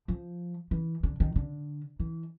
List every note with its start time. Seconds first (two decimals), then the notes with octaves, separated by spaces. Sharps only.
0.08 F3
0.71 E3
1.03 D3
1.20 D#3
1.36 D3
2.00 E3